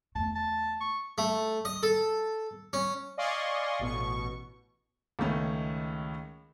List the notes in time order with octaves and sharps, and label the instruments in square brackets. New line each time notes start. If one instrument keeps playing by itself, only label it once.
[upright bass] E2 A3 [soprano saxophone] A5
[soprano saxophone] A5
C#6
[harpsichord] A3
D#5
A4
C#4
[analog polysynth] D5 D#5 F5 G#5 C6 C#6
A1 B2 C#6
[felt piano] C#2 D#3 A3 C#4